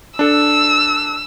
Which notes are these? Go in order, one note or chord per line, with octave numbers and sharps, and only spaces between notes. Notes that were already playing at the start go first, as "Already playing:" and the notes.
D4 A4 E6